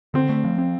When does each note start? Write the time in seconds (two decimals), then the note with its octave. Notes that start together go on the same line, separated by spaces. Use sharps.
0.14 D3 C4
0.29 A3
0.44 F3
0.58 C4